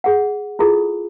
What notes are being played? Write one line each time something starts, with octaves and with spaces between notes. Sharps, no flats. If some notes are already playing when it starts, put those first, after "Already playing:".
G#4 F#5
E4 F4 G#4 A4